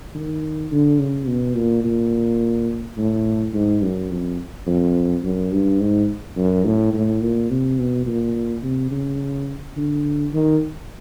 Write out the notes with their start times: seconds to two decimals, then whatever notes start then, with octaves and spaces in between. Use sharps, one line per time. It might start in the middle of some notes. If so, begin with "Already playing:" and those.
0.15 D#3
0.71 D3
0.99 C#3
1.27 B2
1.56 A#2
1.84 A#2
2.97 A2
3.54 G#2
3.83 F#2
4.11 F2
4.67 F2
5.23 F#2
5.52 G2
5.80 G#2
6.36 F#2
6.65 A2
6.93 A2
7.22 A#2
7.50 C3
7.79 B2
8.07 A#2
8.63 C3
8.91 C#3
9.76 D3
10.33 D#3